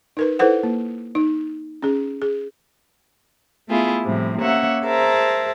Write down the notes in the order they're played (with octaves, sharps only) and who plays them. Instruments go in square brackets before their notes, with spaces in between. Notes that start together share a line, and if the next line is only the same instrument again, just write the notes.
[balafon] D#4 A#4 B4
E4 A4 B4 C5 F#5
A#3
D#4
C#4 G#4
G#4
[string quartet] A3 B3 E4 F4 G#4
A2 C3 F3 G3
A#3 C#4 C#5 E5 F#5
G#4 A#4 C5 E5 A5 A#5